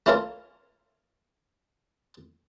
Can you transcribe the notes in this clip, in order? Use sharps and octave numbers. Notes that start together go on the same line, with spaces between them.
A3 C#4 E4 F4 A4 A#4